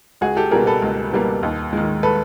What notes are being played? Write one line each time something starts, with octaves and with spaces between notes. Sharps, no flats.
C#2 F#4 G#4
G4 A4
B2 G3 A#3 G#4 A#4
A4 B4
C#2
B2 G3 A#3
D#2
D#3 G#3
A4 B4